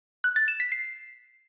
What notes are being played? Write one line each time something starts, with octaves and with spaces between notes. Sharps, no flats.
F#6
A6
E7
B6
C7